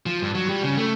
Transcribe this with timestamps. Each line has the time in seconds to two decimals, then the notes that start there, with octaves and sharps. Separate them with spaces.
0.06 F3
0.22 G2
0.35 F#3
0.49 G3
0.63 C#3
0.77 A3